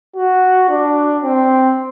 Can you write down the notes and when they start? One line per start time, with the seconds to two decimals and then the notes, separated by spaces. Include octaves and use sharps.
0.16 F#4
0.69 D4
1.24 C4